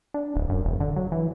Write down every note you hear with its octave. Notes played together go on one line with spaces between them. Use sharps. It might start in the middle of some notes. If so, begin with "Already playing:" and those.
D4
D1
F#2
E1
D3
F#3
E3